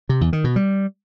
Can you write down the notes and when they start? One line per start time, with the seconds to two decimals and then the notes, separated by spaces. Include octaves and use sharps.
0.09 C3
0.21 E2
0.33 D#3
0.44 B2
0.56 G3